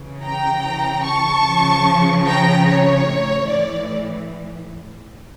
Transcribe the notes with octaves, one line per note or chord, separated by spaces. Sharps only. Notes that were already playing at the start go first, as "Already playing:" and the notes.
Already playing: C#3 E3
G5 A#5
A5 C#6
C#3 F3
G5 A#5
C#5
A2 E3
D5